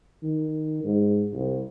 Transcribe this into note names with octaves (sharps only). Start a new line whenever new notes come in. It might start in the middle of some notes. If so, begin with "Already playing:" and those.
D#3
G#2
C2